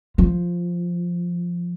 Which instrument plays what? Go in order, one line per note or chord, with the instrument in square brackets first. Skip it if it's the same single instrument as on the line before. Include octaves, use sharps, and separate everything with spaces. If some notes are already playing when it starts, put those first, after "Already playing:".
[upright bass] F3